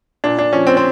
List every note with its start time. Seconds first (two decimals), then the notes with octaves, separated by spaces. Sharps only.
0.24 A#2 D4
0.39 D4
0.53 F3 C#4
0.67 C4
0.77 C4